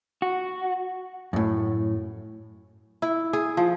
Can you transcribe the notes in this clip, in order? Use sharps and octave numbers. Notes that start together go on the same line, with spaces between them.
F#4
F#2 A2
E4
G#4
F3